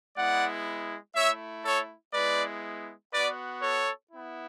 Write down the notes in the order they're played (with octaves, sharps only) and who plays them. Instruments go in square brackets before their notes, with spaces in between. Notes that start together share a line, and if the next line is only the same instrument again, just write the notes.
[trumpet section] G#3 B3 E4 D5 F#5
A3 E4 C#5 E5
A4 C#5
G#3 B3 E4 B4 D5
B3 F#4 B4 D5
A4 C#5
B3 E4